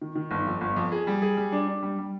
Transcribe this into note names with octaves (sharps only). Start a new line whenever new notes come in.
D#3
D#3
G1
F2
G1
F2
G#4
G3
G#4
G3
D4
D4
G3
G3